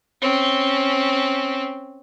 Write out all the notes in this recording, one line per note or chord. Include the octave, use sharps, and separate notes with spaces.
C4 C#4